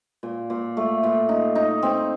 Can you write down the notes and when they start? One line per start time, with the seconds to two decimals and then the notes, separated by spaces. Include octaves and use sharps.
0.23 A#2
0.50 A#2
0.77 A3
1.03 A#2
1.29 D#4
1.55 D#4
1.83 C4